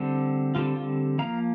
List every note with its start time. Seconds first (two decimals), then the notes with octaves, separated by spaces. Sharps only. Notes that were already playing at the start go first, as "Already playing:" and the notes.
Already playing: D3 G3 C4
0.55 D3 G3 C4 F4
0.76 F4
1.18 F3 A#3 F5 A#5